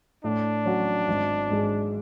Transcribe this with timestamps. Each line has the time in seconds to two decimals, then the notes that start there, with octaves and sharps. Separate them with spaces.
0.24 A2 D4
0.65 F#3 C#4 F#4
1.08 G#1
1.50 G#2 G#3